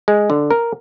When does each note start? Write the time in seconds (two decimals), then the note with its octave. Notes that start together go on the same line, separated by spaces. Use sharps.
0.08 G#3
0.30 D3
0.51 A#4